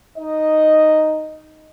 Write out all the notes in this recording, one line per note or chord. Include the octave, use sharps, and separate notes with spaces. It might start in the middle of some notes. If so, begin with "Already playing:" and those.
D#4 D#5